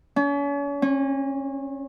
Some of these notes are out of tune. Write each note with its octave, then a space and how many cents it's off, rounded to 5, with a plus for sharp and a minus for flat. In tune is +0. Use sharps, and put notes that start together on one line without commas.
C#4 +40
C#4 -30